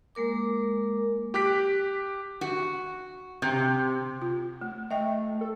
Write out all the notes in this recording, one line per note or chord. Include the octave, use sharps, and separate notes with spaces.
G#3 A#3 A#4 D6
G4 D6 F#6 B6
F#4
C3
F4
A3
A3 D#5 G5
A4